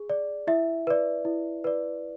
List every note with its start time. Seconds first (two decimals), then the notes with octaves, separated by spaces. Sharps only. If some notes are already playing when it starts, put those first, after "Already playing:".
Already playing: G#4
0.10 D5
0.47 E4 E5
0.87 B4 D5
1.25 E4
1.64 B4 D5